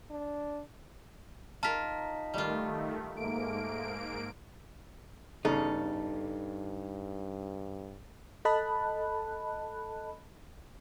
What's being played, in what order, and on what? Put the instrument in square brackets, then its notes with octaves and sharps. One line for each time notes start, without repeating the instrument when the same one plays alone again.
[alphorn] D4
[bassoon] D#4 [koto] F4 A#4 [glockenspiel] A5 B6
[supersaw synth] D#3 A3 [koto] G3 F4
[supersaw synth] G#2 A#3 D7 [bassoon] A3
[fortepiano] E2 C#3 [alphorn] G2 [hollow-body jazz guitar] D#4 [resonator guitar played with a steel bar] A4
[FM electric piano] A4 D#5 A5 B5 F#6